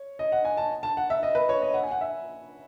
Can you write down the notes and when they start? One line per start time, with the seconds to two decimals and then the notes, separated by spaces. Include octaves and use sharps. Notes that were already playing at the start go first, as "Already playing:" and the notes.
Already playing: C#5
0.19 D#5
0.32 F#5
0.45 G#5
0.57 A5
0.83 A5
0.97 F#5
1.10 E5
1.23 D#5
1.35 B4
1.49 C#5
1.62 D#5
1.74 F#5
1.83 G#5
1.91 F#5
2.01 E5